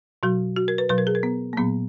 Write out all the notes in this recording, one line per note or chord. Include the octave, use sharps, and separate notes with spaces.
B2 F#3 F#4
F#4
A#4
B4
B2 F#3 B4
A#4
G#4
A#4
B3
A#3
A#2 F#3 B3